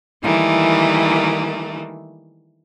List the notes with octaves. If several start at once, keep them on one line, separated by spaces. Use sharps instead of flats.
D#3 E3 G3 A3 A#3